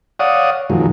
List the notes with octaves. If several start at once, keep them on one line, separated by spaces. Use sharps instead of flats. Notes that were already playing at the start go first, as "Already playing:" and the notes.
C#5 D5 F5 F#5 D#6
F#2 A#2 D#3 F3 F#3 G#3